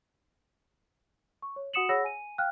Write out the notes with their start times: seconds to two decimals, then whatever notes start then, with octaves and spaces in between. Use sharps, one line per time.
1.42 C#6
1.56 C#5
1.74 F#4 F#5 D#6 C#7 E7 F#7
1.89 G#4 C#5 F#5 B5 E6 A#6
2.04 G#5 D#7
2.38 F5 G5 F6 F#6